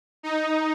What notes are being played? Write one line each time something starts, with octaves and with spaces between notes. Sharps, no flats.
D#4